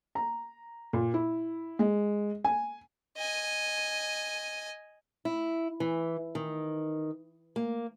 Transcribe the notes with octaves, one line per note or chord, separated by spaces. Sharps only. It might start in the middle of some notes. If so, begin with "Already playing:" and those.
A#5
A#2
E4
G#3
G#5
D#5 G#5
E4
E3
D#3
A#3